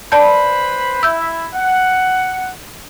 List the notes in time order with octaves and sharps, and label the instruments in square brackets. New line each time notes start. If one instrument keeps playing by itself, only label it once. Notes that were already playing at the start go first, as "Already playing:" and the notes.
[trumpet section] B4 C5 B5 [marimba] D5 A5 G6
[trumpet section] E4 E5 [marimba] E6 G6
[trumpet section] F#5